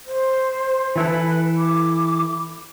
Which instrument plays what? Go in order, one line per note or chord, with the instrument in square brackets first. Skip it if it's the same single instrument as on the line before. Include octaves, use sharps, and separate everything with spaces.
[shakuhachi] C5
[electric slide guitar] E3 E4 A4 [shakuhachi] B4
[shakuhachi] D6